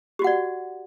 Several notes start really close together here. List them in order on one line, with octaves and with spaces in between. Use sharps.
G4 F#4 F#5 D5